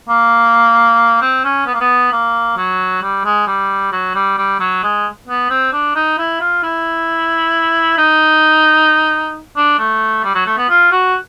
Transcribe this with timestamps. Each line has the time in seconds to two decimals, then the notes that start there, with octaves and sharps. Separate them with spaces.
0.09 A#3
1.21 C4
1.44 C#4
1.66 B3
1.74 A#3
1.81 B3
2.12 A#3
2.57 F#3
3.02 G3
3.25 G#3
3.47 G3
3.92 F#3
4.15 G3
4.38 G3
4.60 F#3
4.83 G#3
5.28 B3
5.50 C4
5.73 D4
5.95 D#4
6.18 E4
6.40 F4
6.63 E4
7.98 D#4
9.56 D4
9.79 A3
10.24 G3
10.35 F#3
10.46 A3
10.58 B3
10.69 F4
10.92 F#4